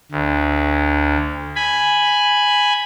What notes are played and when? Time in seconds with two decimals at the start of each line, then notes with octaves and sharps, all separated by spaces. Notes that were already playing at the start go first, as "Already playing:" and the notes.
0.11 D2
1.56 G#5 B5